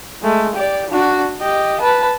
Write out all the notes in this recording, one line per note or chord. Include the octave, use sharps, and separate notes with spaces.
G#3 A3
G4 D5
D4 F#4
G4 D#5
B4 A5